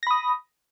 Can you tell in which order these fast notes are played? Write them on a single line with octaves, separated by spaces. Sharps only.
A#6 B5 D#6